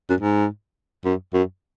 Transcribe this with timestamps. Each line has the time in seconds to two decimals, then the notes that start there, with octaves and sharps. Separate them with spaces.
0.10 F#2
0.20 G#2
1.05 F#2
1.34 F#2